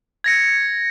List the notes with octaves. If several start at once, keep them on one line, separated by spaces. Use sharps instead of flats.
G#6 A#6 C#7